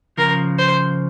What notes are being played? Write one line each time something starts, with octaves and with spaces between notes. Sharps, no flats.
C#3 F3 A#4
C5